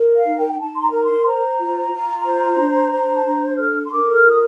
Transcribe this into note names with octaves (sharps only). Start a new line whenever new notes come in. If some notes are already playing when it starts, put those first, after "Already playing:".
Already playing: A#4
F5
D#4
G5
G5
D#4 A5
C6
A#5
A#4 A#5
C6
C5 A#5
F4
F4
C5
D4
C5
A5
D4 A#5
A4 F6
C6
A#4 D6
F6
F4 D#6